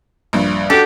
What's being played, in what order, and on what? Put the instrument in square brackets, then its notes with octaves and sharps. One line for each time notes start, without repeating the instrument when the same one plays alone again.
[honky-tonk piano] A#1 G2
[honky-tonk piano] D4 F#4 [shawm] G4 [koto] A4